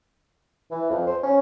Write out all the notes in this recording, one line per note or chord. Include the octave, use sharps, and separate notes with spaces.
E3
F2
C5
C#4